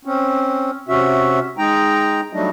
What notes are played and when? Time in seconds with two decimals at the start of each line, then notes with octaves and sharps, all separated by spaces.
0.05 C4 C#4
0.88 C3 C#4 F#4 E5
1.58 G#3 D#4 G5 A#5
2.33 F#3 G3 A3 D4 D#4 D#5